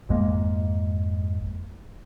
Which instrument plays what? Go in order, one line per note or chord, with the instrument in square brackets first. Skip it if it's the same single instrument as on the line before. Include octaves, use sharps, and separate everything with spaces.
[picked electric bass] G#1 F2 G#3 A#3